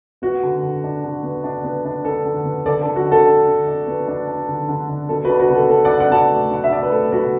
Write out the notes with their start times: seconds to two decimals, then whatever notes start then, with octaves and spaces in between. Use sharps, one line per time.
0.22 B3 F#4
0.43 D3
0.63 D3
0.84 D4
1.04 D3
1.23 B3
1.44 D4
1.64 B3
1.85 D4
2.05 D4 A4
2.25 D3
2.45 B3
2.66 D3 A4 D5
2.81 A4
2.86 D3
2.96 F#4
3.07 D4
3.12 A4
3.27 D4
3.47 D3
3.68 D4
3.87 B3
4.08 D4
4.28 D4
4.49 D3
4.69 D3
4.89 D4
5.09 B2 A4
5.24 F#4 B4
5.29 D4
5.39 F#4 B4
5.50 B2
5.55 A4
5.70 B2 A4
5.85 D5 F#5
5.91 D4
6.00 D5 F#5
6.11 B2 A5
6.16 D5 F#5
6.31 A3
6.51 D4 F#5
6.64 E5
6.71 D4 D5
6.83 B4
6.91 A3 A4
7.11 B2 F#4 B4